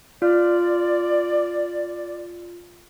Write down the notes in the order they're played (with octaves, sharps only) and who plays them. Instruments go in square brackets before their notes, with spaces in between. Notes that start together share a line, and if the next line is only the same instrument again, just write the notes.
[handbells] F4 F6 [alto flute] D5